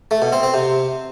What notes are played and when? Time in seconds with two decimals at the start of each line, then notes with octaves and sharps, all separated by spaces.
0.11 A3
0.22 B2
0.32 C4
0.43 C4
0.54 C3